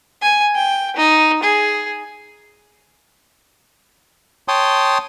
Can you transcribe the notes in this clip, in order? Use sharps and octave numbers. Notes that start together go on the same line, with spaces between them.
G#5
G5
D#4
G#4
C#5 G5 A5 C6 D#6